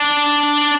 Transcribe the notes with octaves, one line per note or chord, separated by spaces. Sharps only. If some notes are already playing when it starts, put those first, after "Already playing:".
Already playing: D4